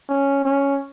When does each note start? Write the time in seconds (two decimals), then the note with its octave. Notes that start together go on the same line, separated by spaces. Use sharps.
0.09 C#4
0.45 C#4